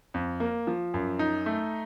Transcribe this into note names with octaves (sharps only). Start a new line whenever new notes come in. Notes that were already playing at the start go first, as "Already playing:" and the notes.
F2
A#3
F3
F#2
D#4
A3